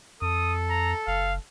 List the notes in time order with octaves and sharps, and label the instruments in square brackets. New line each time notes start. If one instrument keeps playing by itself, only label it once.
[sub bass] F2 [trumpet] A4 [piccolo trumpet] D#6
[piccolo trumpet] A#5
[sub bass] F#1 [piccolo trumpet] F5